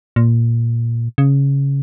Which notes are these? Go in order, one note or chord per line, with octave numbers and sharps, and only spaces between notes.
A#2
C#3